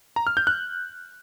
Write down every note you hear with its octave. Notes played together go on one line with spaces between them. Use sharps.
A#5
F6
G6
F#6